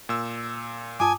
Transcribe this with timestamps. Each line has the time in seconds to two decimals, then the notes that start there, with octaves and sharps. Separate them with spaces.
0.09 A#2 E6
1.00 G2 F4 G#5 A5 D6 D#6